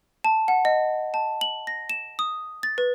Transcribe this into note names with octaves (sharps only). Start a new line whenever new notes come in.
A5
F#5
D#5
A5
F#7
A#6
E7
D#6
A6
B4